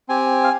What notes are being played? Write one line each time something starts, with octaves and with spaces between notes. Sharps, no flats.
C4 G4 G#5
F5